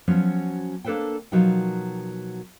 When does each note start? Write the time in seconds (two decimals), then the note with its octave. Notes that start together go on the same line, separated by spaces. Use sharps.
0.08 F3 F#3 B3 C#4 F#4
0.84 A#3 D4 A4 B4 C5 G5
1.32 B2 F3 F#3 D#4 A#4 G5